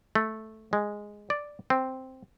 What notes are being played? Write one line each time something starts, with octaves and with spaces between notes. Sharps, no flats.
A3
G#3
D5
C4